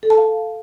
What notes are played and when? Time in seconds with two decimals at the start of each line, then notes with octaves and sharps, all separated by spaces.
0.03 A4
0.10 A5
0.18 F5